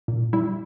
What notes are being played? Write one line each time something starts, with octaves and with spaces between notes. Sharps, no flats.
A#2
G3 E4